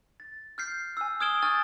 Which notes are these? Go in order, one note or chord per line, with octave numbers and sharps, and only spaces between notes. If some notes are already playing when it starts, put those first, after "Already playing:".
A6
F6 G6 C7
G#5 E6
D#6 F6 G#6 D7 E7 G7
G#5 C#6 F6 G6 A6